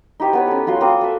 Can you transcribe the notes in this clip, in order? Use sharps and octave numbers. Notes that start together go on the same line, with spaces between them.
D#4 E4 G4 C5
B3 B4 C#5
C#4 A4
F#3 F4 F#4 C6
A#3 C4 D6 D#6
A4 E5